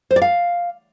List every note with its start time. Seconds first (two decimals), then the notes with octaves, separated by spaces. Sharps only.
0.11 C5
0.16 D5
0.22 F5